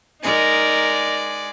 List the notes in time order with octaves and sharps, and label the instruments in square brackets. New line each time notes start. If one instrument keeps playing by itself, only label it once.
[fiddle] G#3 D5 [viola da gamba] D#4 A#4